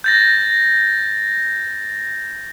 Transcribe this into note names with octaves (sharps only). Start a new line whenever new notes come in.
G6 A6 A#6